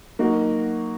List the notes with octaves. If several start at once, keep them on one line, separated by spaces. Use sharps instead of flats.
F#3 A#3 D#4 F#4